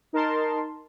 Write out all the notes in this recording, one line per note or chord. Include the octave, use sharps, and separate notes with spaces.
D#4 A#4 A5 C6